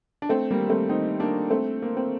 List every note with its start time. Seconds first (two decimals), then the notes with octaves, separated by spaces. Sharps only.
0.22 D4
0.29 A3 C4
0.51 G3 A#3
0.69 A3 C4
0.89 C4 D#4
1.20 A#3 D4
1.50 A3 C4
1.82 A#3
1.97 C4